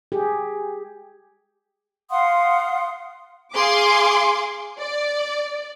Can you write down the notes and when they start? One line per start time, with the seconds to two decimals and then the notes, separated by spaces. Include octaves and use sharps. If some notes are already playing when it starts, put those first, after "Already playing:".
0.12 G4 G#4
2.10 F5 F#5 C6 D#6
3.55 G#4 F5 C6 D6
4.79 D5